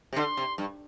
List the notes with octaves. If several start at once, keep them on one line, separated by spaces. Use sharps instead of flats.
C3
D3 C6
C3
G2